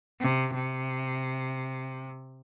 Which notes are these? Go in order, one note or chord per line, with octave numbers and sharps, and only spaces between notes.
C3
C3